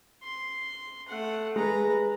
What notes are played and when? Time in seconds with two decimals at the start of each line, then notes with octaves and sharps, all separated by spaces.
0.23 C6
1.08 A3 F#5
1.56 G#3 B4 A#5